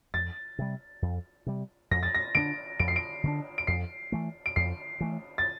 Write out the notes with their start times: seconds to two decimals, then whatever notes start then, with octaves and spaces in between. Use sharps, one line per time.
0.14 F2 A6
0.59 C3 G3
1.02 F2
1.46 C3 G3
1.91 F2 A#6
2.03 A6
2.15 A#6
2.35 D3 A3 D4 D7
2.79 F2 D7
2.88 C7
2.96 D7
3.24 D3 A3 D4
3.58 D7
3.67 F2 C7
4.12 E3 A3
4.46 D7
4.56 F2 C7
5.00 E3 A3
5.38 A6